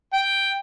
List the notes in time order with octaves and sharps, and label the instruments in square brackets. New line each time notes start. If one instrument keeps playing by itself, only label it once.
[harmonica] G5